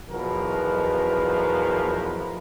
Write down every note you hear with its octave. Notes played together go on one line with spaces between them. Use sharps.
B1 E2 B2 F3 A#4 B4